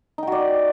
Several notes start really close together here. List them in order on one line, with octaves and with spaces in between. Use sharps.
D#4 G5 F#4 D5